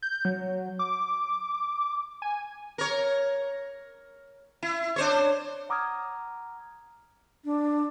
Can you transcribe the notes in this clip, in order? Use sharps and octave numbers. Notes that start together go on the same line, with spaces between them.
G6
F#3
D6
G#5
A#4 C#5
E4
D4 C5 C#5
F#5 A#5 D6 D#6 F6 G#6
D4